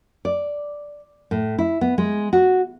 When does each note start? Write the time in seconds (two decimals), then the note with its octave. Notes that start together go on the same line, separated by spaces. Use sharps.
0.25 D5
1.31 A2
1.59 E4
1.81 B3
1.98 G#3
2.33 F#4